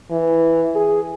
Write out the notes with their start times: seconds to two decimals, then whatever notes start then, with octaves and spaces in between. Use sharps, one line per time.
0.11 E3
0.76 G#4